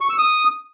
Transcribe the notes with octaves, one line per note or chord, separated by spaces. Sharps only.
C#6
E6
D#6